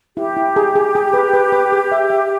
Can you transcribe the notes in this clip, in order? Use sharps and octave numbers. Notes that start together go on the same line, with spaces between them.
E4 G4
E4
G#4
G#4
G#4
B4
B4
B4
G#4
E5
E5